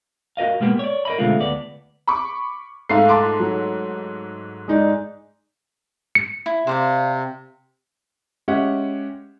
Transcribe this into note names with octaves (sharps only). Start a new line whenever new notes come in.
F#4 A#4 D#5 F5
B2 G#3 A#3 B3 G4
C#5 D5
A#4 D#5 B5
B2 D3 G#3 A3 C4 F4
D2 B3 D5
B5 C#6 D6
G#2 A3 F5 C7
A5 C6 D6
F#3
G#3 D#4 D5
C#7
E4
C3 C5 D5 F5
G#3 C#4 G4 E5 F#5